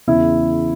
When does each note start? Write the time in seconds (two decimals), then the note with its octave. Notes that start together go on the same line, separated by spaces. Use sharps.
0.07 E2 C#3 E3 E4